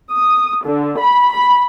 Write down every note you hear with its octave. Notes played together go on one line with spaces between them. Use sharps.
D#6
D3
B5
B5